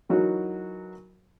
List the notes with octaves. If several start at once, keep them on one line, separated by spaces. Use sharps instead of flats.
E3 F#3 D#4 F#4 A#4